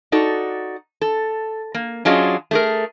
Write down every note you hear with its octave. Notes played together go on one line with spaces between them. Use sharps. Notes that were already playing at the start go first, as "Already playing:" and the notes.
D#4 F#4 A4 D5
A4
A#3
F#3 C#4 D4 F4 G#4 D#5
A3 G#4 A#4